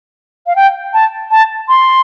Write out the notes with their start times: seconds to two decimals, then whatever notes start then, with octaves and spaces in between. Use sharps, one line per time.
0.47 F5
0.56 G5
0.94 A5
1.31 A5
1.68 C6